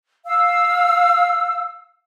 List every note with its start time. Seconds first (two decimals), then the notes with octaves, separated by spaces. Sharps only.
0.27 F5 E6